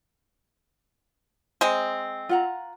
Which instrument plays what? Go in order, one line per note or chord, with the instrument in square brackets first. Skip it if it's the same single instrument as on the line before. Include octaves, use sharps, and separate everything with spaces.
[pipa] G#3 C4
[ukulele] F4 F#5 A#5